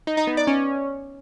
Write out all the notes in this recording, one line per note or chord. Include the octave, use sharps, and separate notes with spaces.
D#4
D#4
B3
D5
C#4